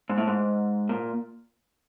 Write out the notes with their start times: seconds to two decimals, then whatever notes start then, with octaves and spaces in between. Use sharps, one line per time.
0.10 G#2
0.18 A2
0.27 G#2
0.89 A#2